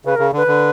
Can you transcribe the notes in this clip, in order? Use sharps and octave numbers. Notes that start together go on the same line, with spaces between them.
C#3 B4
C#3 A#4
D3 B4
D3